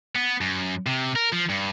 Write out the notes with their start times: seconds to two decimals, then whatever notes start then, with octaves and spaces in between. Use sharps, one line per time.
0.15 B3
0.41 F#2
0.86 C3
1.16 A#4
1.32 F3
1.49 G2